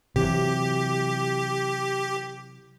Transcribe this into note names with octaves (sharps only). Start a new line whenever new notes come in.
C3 E3 F#3 G4